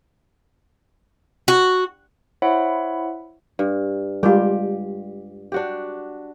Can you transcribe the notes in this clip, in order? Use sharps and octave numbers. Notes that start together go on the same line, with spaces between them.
F#4
E4 C5 C#5 E5 F#5 B5
G2
G3 G#3 F4 G4
D4 F#4 G4